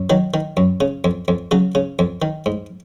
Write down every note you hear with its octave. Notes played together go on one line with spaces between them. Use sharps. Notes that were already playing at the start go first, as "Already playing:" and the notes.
Already playing: F#2
D#3 F#3
D#3
F#2
C#3
F2
F2
C#3 F#3
C#3
F2
D#3
G#2